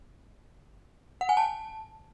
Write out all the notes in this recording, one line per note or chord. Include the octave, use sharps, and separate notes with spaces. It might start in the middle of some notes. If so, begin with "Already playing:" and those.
F#5
G#5
A5